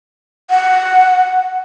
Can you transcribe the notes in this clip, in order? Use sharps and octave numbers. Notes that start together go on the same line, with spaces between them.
F#5